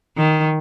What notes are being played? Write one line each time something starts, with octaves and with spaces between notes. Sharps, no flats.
D#3